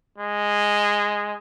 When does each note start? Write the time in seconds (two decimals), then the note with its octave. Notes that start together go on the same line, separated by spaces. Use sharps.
0.18 G#3